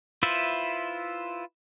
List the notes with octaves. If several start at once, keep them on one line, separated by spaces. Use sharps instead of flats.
E4 F4 B4 C5 E5